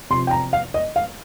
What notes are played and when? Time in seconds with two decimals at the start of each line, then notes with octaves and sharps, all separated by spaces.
0.10 C3 C6
0.14 F3
0.27 G5
0.31 A#5
0.53 F5
0.74 D#5
0.96 F5